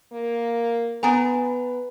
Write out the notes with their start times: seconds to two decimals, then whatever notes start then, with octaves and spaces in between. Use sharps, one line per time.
0.12 A#3
1.03 B3 B4 G#5 A#5